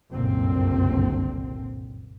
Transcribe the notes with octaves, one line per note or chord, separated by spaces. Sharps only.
F#1 C2 G2 A#2 D3 C4